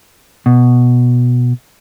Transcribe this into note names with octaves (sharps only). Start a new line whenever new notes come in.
B2